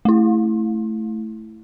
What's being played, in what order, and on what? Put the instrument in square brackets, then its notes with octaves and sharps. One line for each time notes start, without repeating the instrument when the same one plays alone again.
[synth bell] A3 E4